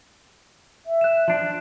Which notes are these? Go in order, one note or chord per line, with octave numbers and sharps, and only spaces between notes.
E5
F#6 E7
F3 D4